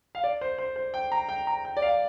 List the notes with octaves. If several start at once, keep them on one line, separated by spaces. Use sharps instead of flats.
F5
D5
C5
C5
C5
G5
A#5
G5
A#5
G5
D5
F5